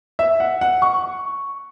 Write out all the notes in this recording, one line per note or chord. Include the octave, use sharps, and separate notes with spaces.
E5
F#5
F#5
C#6